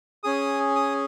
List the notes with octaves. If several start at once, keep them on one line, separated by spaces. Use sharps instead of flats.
C#4 G#4 D#6
D#6